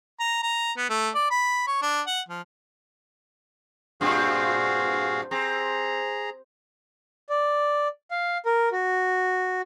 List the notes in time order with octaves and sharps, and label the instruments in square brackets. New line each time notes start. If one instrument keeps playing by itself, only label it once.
[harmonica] A#5
A#5
B3
A3
D5
B5
C#5
D4
F#5
F3
[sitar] G2 A#2 C4 [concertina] F#4 G#4 F5
[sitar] C4 [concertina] G#4 A#5
[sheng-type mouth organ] D5
F5
A#4
F#4